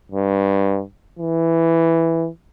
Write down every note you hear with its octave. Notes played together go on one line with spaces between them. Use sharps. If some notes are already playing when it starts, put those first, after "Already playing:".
G2
E3